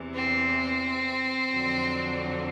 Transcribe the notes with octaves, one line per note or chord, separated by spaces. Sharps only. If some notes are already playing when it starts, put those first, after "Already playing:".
Already playing: E2 C3 E3
C4
F2 D3 F#3